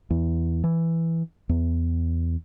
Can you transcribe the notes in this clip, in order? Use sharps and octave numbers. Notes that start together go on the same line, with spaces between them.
E2
E3
E2